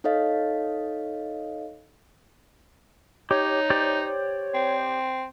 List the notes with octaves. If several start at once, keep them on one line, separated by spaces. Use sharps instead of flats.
D#4 A4 C#5 D#5 F5
D#4 G4 C#5
G4 C5 D5
C4